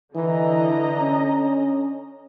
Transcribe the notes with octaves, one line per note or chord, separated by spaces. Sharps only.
D3 E3 D#5 A#5
C#4